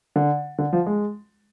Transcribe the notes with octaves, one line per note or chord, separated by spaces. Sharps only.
D3
D3
F3
G#3